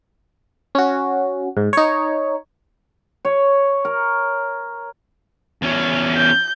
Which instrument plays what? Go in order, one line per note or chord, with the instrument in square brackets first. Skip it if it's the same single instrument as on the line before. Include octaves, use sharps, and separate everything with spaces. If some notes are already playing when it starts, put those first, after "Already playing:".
[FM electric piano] C#4 F#4
G#2
D#4 C#5
[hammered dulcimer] C#5
A#4
[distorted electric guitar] E2 C#4
[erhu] G6